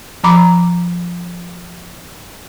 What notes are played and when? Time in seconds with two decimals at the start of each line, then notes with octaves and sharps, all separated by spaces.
0.24 F3 A#5 B5 D6